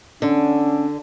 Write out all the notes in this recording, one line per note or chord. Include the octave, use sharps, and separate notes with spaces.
D3 C#4 D4